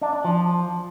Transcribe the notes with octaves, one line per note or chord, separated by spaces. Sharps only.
D4
D4
F3